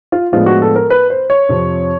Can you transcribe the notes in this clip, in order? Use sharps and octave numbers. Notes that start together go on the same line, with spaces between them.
F4
A2 F3 G#3 B3 D4 F4
F#4
A4
A#4
B4
C5
C#5
F2 C3 F3